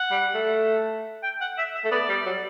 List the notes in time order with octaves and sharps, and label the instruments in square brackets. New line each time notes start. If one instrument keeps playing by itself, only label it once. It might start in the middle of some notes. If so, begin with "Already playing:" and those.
Already playing: [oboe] F#5
[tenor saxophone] G3
A3
[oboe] G5
F#5
E5
E5
[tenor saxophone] A3
[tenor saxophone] B3 [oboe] D5
[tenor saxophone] G3
F#3